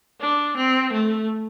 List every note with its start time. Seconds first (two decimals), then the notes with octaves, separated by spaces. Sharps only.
0.20 D4
0.57 C4
0.93 A3